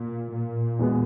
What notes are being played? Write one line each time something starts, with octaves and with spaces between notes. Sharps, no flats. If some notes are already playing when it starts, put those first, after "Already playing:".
Already playing: A#2
A#2
E2 B2 G#3 B3